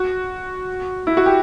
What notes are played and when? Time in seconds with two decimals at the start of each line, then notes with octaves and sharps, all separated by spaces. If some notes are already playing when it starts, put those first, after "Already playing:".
Already playing: F#4
1.07 E4
1.17 F#4
1.26 G4